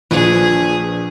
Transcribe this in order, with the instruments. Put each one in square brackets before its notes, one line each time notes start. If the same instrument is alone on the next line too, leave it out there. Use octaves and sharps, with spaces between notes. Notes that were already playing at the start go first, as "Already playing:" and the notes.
[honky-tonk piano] A#1 [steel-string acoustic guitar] F3 D4 B4 [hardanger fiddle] G#4